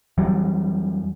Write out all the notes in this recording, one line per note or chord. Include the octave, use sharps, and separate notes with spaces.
F2 E3 F#3 G3